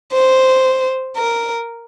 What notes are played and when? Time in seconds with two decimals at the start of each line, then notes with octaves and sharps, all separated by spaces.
0.13 C5
1.16 A#4